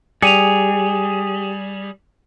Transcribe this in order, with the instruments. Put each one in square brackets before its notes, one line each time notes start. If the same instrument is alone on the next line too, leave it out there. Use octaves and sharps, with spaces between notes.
[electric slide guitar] G3 [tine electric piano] G4 [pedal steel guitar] G#4 [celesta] C#7 D#7 F7